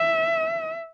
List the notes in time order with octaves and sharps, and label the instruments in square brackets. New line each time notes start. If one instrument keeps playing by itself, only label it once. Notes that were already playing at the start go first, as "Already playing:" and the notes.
Already playing: [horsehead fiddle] E5